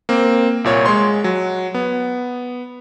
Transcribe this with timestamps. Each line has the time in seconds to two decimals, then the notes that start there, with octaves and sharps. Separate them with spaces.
0.09 A#3 C4
0.64 C2 A#2 C#5
0.86 G#3 C#5 C6
1.24 F#3
1.74 B3